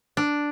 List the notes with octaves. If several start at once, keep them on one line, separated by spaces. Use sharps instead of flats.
D4